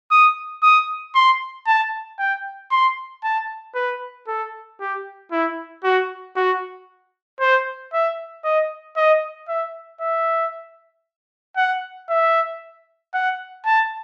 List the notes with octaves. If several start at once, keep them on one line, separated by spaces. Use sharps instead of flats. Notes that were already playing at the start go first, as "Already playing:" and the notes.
D#6
D#6
C6
A5
G5
C6
A5
B4
A4
G4
E4
F#4
F#4
C5
E5
D#5
D#5
E5
E5
F#5
E5
F#5
A5